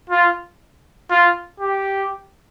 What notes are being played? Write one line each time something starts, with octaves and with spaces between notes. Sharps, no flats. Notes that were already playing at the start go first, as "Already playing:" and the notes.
F4
F4
G4